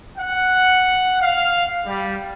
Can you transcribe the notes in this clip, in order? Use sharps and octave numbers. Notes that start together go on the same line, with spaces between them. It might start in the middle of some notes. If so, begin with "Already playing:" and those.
F#5
F5
G3